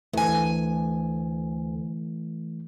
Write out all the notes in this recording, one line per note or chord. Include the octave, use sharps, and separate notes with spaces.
D2 E3 A3 G#5